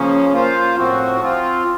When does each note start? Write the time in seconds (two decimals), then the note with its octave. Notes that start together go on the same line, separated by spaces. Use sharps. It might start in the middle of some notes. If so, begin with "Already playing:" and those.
Already playing: C#3 F3 A#3 C#4
0.33 A#3 F4 C5 F5
0.76 A2 F3 C4 F#4
1.19 F3 C4 F4